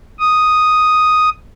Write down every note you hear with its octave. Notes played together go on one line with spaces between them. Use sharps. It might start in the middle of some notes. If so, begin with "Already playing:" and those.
D#6